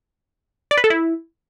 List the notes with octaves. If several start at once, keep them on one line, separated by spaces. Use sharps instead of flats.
D5
B4
A4
E4